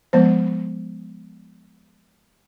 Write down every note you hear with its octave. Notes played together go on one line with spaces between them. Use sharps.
F3 G#3 B3 C5